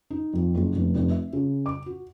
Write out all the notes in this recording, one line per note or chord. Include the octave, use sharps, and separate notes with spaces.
D#4
F2
F#1
F1
F1
E5
C#3
D6
F#4